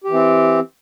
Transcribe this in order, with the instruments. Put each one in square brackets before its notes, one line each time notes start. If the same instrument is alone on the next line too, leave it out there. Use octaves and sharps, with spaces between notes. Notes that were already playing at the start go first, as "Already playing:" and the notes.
[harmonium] G4
E3
C4